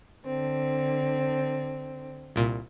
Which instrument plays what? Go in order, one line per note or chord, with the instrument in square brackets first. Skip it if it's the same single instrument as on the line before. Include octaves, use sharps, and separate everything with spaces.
[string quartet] D3 C4
[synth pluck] C2 A#2